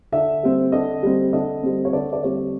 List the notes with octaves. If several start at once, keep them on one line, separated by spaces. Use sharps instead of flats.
D3 E5
G3 C4
D3 D#5
G3 C4
D3 D#5
G3 C4
C#5
D3 D5
D5
G3 C4 C#5